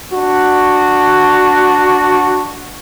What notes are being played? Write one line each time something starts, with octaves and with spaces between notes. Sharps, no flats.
D4 F#4